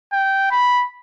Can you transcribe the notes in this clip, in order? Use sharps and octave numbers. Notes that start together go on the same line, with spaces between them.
G5
B5